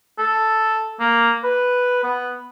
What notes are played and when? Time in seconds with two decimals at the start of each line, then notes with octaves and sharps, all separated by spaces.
0.19 A4
1.00 A#3
1.44 B4
2.04 B3